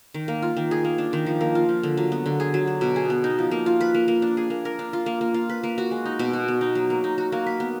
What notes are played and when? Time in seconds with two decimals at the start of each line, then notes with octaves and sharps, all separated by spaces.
0.14 D#3
0.28 A#3
0.42 F4
0.57 D#3
0.71 G#4
0.84 A#3
0.98 D4
1.13 D#3
1.26 F3
1.41 A#3
1.55 F4
1.69 F3
1.83 D3
1.97 F#3
2.12 B3
2.26 D3
2.40 G#4
2.54 F#3
2.67 D4
2.81 B2
2.96 G#4
3.10 B3
3.24 D#4
3.39 F3
3.51 A#3
3.66 F4
3.81 B4
3.94 A#3
4.08 A#3
4.22 D4
4.37 G#4
4.50 A#3
4.65 A#4
4.79 D4
4.93 F4
5.06 A#3
5.21 A#3
5.34 F4
5.49 B4
5.63 A#3
5.78 F#4
5.91 G#3
6.05 D#4
6.19 B2
6.33 F#4
6.48 B3
6.61 D#4
6.75 F#3
6.90 A#3
7.04 D#4
7.18 F#4
7.32 A#3
7.46 B4
7.60 B3